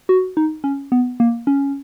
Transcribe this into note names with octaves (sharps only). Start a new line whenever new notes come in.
F#4
D#4
C#4
B3
A#3
C#4